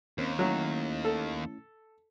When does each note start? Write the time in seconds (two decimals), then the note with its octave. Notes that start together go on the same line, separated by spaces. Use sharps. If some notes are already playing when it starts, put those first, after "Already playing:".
0.18 D#2 A#3 C4 C#4
0.39 F#3 A3 C#4 E4
1.05 A4